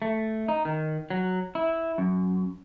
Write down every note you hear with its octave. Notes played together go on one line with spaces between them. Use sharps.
A3
D#4
D#3
F#3
E4
F#2